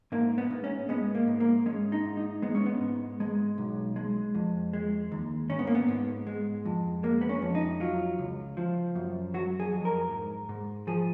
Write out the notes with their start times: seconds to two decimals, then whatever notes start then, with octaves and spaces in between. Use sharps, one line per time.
0.12 G#2 A#3
0.38 B3
0.51 G#2
0.64 C#4
0.89 G#3 B3
1.15 A#3
1.27 G#2
1.40 A#3
1.66 G#3 C#4
1.92 D#4
2.05 G#2
2.17 D#4
2.42 G#3 B3
2.55 C#4
2.66 B3
2.81 G#2
3.20 G#3
3.58 B1
3.96 G#3
4.35 F2
4.73 G#3
5.12 D#2
5.50 G#2 C#4
5.59 B3
5.67 A#3
5.75 B3
5.88 G#2
6.27 G#3
6.65 F2
7.03 G#3 A#3
7.21 B3
7.29 C#4
7.42 F2
7.55 D#4
7.80 F#3 F4
8.18 C#2
8.57 F3
8.95 F#2
9.34 F#3 F#4
9.60 G#4
9.72 F2
9.85 A#4
10.11 G#2
10.49 G#2
10.87 F3 G#4